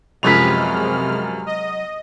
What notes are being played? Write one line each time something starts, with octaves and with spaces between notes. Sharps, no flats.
F#2 C3 F3 F#3 G#3 B4 F6 F7
D#5